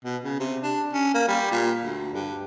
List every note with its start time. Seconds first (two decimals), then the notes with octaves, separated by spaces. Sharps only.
0.05 B2
0.24 C#3
0.40 C3
0.63 D4
0.94 C#4
1.14 A#3
1.28 G3
1.52 A#2
1.84 D2
2.14 G2